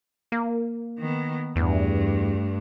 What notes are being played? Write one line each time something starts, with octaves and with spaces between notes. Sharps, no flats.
A#3
D#3 B3
E2 G2 A3